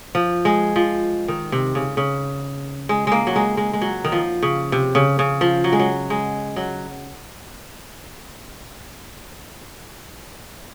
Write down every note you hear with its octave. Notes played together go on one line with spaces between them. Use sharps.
F3
G#3
F3
D#3
C3
C#3
C#3
G#3
G#3 A#3
F#3
G#3
G#3
G#3
F#3
D#3
F3
C#3
C3
C#3
C#3
F3
F#3
G#3
F#3
G#3
F#3